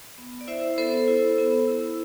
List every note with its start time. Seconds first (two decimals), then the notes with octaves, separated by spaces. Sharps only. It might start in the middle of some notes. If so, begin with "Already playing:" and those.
0.18 B3
0.41 D5
0.48 E4 C5 E5
0.78 B3 A4 C5
1.08 E4
1.38 B3
1.67 E4